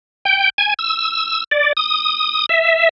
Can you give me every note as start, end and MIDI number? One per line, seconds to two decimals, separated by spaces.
0.25 0.49 79
0.58 0.74 80
0.79 1.44 88
1.51 1.73 74
1.77 2.46 87
2.49 2.89 76